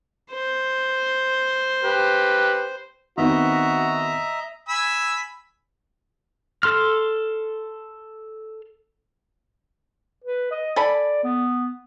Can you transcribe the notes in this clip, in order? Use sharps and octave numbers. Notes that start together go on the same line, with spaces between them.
C5
G4 B4
D#3 B3 C4 F#4 D#5 E5 A#5
G#5 B5 E6
A4 C6 F6
B4
D#5
A4 D5 G#5 B5
B3